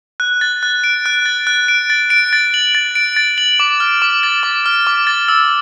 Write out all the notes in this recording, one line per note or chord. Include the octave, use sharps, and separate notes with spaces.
F#6
A6
F#6
D7
F#6
A6
F#6
D7
A6
D7
A6
F#7
A6
D7
A6
F#7
D6
F6
D6
A6
D6
F6
D6
A6
E6